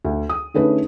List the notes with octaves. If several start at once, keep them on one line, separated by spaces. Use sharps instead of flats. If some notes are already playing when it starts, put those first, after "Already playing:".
D2
D#6
D3 A3 C#4 D#4 G#4 B4